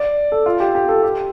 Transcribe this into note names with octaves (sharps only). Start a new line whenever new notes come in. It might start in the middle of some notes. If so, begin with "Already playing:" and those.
Already playing: D5
A4
F4
G4
G4
A4
G4